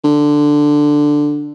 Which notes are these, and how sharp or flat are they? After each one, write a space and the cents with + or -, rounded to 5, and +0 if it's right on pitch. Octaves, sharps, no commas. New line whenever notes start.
D3 +5